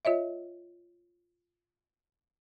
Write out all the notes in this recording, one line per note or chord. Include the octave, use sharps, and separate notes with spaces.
F4 C#5 D#5 E5